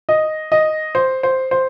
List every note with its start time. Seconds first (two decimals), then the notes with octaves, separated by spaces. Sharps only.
0.09 D#5
0.52 D#5
0.95 C5
1.23 C5
1.51 C5